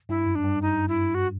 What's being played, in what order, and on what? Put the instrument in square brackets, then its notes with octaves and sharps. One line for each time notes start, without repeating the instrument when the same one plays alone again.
[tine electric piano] G2 [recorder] E4
[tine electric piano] F#2
[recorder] D4
[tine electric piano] G2
[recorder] D#4
E4
F#4